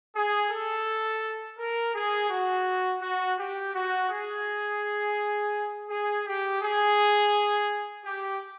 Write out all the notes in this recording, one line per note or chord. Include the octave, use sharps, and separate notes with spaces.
G#4
A4
A#4
G#4
F#4
F#4
G4
F#4
G#4
G#4
G4
G#4
G4